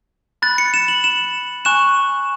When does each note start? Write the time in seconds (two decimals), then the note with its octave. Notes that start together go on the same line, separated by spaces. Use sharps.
0.42 B5 F#6 A6
0.58 C#7
0.74 E7
0.88 F#7
1.04 E7
1.65 G#5 C#6 F#6 E7